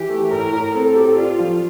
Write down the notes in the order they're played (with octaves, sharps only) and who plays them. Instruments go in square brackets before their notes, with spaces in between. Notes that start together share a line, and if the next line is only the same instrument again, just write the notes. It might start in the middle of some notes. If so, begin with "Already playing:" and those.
Already playing: [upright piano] E3 [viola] G4
[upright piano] A3
[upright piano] A2 [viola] A#4
[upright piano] A2
[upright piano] C4 [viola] A4
[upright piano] G4
[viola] F4 [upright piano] D5
[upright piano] F3